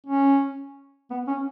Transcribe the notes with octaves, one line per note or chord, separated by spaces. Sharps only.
C#4
B3
C#4